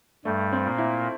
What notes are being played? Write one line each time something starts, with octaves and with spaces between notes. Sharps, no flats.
G2 G3 A3
C4
A#2 A#3
E4